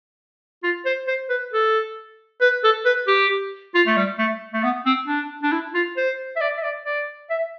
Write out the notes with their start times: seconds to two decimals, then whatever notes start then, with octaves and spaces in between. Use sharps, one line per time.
0.64 F4
0.85 C5
1.07 C5
1.30 B4
1.53 A4
2.41 B4
2.64 A4
2.86 B4
3.07 G4
3.74 F4
3.87 A3
3.97 G3
4.18 A3
4.53 A3
4.63 B3
4.86 C4
5.07 D4
5.43 D4
5.52 E4
5.74 F4
5.97 C5
6.36 E5
6.41 D5
6.57 E5
6.63 D5
6.86 D5
7.30 E5